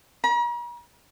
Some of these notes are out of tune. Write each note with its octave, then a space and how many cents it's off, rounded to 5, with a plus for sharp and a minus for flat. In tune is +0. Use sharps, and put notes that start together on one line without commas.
A#5 +45